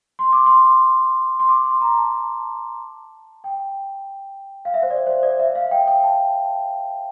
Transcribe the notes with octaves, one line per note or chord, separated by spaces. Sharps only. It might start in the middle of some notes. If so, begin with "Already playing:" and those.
C6
D6
C6
C6
D6
C6
A#5
A5
G5
F5
E5
C5
D5
C5
D5
E5
F5
G5
G5
A5